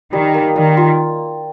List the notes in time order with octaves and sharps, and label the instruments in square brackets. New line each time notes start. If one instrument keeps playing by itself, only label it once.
[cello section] D#3 [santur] G3
[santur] A#3
[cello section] D#3 [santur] G3
[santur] F4